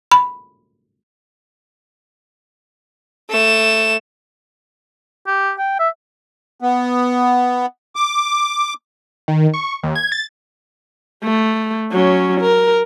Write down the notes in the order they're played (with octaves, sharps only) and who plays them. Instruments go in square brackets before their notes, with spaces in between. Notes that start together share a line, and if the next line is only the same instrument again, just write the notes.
[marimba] B5
[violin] A3 E7
[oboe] G4
G5
E5
[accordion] B3
D6
[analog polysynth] D#3
C#6
D#2
G#6
A6
[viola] A3
F#3 C#4
A#4